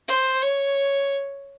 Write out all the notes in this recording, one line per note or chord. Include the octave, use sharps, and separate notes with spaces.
C5
C#5